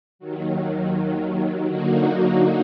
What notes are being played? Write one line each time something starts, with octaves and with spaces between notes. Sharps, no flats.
D#2 D#3 F#3
D3 F#3 A#3 D#4 F#4